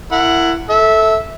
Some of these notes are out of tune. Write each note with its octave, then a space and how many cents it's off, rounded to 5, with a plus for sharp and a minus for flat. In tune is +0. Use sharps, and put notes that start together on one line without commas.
E4 +20 A#4 -25 F#5 +0
A4 +0 E5 -15